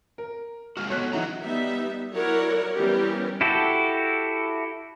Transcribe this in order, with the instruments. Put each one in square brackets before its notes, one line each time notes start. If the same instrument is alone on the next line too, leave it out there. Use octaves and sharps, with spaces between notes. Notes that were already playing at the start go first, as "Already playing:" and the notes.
[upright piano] A#4
[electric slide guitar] G#3 A#3 F#4 [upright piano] F6
[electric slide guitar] B3 F#4 A4 [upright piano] C#5 F#6 B6
[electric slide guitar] E3 F#3 A#5 [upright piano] D#4 E4 F#4
[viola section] G3 B3 D#4 E5
F#3 E4 A#4 C#5 D5 F#5
E3 G3 B3 C#4 G4 A#4
[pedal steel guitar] E4 F#4 G4 A4